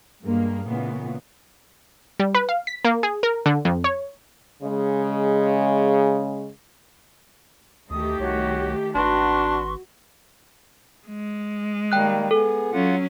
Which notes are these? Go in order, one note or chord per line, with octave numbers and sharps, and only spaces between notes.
G2 G#3 A#3
A#2 C#3 E3 B3
G3
B4
F5
B6
A#3
G#4
A#4
D3
F2
C#5
C#3 G#3
D2 D#3 A3 G4 D#6
C2 F#4 C#5
G#1 D4 F#4 B4 C6 C#6
G#3
D#3 G3 A#3 G5 F#6
B3 G#4 A4
F#3 C#4 F4 F#5